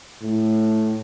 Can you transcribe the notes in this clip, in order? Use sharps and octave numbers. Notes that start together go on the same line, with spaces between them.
A2